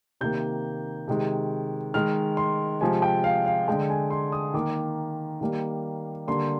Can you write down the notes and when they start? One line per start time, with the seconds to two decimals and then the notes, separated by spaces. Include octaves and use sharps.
0.21 C3 D#3 A#3 G6
1.08 C3 D#3 G#3
1.94 D#3 G#3 F6
2.37 C6
2.81 C3 F3 G#3 G#5
3.02 G5
3.24 F5
3.46 F5
3.68 D3 G#3 G5
3.90 G#5
4.10 C6
4.32 D#6
4.54 D#3 A#3 D6
5.41 D#3 G3 A#3
6.27 D3 G3 A#3 C6